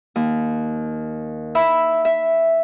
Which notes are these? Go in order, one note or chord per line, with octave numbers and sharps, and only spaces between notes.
D#2
E5 B5 E6
E5